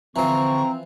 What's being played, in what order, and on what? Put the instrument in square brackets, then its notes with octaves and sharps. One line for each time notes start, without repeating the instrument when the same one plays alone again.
[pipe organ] D3 C#6 [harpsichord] E3 F3 [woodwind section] C4 [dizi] A#5